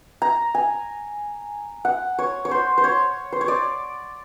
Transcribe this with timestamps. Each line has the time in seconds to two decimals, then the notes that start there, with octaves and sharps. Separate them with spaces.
0.22 A#5
0.55 G#5
1.85 F#5
2.19 C#5
2.45 C#5
2.51 C5
2.78 C5
2.84 C#5
3.32 C5
3.41 C#5
3.48 D5